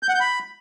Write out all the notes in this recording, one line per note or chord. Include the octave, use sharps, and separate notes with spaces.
G6
F#5
G6
B5